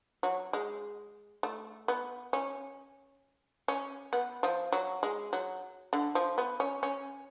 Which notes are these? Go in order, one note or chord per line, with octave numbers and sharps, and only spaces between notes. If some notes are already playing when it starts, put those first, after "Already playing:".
F#3
G#3
A3
B3
C#4
C#4
B3
F3
F#3
G#3
F#3
D3
F3
B3
C#4
C#4